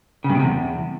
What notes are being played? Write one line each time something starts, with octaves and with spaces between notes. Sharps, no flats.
C#3
G2
B2
C3
E2